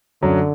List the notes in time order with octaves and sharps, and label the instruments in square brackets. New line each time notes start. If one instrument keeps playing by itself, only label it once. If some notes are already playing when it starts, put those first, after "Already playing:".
[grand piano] F#2 F#3 [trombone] D3